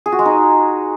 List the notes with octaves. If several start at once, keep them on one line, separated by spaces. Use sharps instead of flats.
G#4
F#4
G#3
D#4